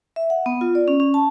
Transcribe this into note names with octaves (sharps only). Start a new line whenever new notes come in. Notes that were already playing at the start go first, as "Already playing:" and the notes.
E5
F#5
B3
F4
D5
C#4
C#4
A5